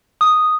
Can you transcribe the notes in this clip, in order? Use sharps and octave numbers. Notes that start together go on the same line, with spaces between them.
D#6